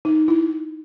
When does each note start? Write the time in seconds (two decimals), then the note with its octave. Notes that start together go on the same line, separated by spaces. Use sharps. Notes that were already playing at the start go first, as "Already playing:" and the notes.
0.05 D#4
0.28 E4